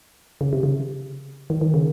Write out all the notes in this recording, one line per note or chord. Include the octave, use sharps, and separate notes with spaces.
C#3
C3
C#3
D#3
D#3
C#3